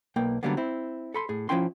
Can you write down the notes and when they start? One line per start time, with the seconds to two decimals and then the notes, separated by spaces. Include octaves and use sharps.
0.16 B1 A#3 G5
0.43 D3 E3 F#3 G3 A#3 B3
0.57 C4 E4
1.14 A4 B5 C6
1.29 A2 G#4
1.49 F3 F#3 C#4 E4 G5 C6